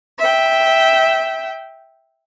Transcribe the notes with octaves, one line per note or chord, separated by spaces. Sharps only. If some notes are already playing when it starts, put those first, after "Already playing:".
E5 G5